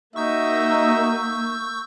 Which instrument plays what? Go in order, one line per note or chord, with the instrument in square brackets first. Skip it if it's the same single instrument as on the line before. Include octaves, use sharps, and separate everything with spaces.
[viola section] A#3 [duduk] D#4 [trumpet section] F#4 D#5 E5 [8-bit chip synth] C#6 E6 G6